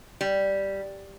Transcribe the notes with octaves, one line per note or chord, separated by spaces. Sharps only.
G3